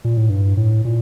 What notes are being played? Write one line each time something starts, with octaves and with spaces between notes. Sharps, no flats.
A#2
A2
G2
A2
A#2